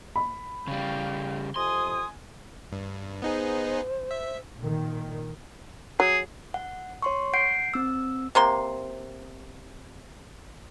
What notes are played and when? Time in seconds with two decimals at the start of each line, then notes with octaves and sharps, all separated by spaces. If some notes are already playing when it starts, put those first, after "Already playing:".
0.16 B5
0.68 C#3 G3 F5 G5
1.56 F2 C3 G#5 C6 D#6
2.72 G2
3.22 B3 D#4 G#4 C5
4.11 E5
4.59 A#2 D#3
6.00 F#3 G#4
6.54 F#5
7.02 C#5 C6 C#6
7.34 F#5 G6 C7 D7
7.74 C4 E6
8.35 C3 A#3 C6